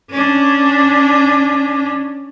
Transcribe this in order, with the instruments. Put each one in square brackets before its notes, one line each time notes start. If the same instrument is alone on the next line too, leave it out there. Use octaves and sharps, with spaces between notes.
[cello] C#4 D4